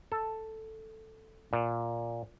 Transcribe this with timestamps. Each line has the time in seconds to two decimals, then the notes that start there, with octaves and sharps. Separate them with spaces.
0.12 A4
1.53 A#2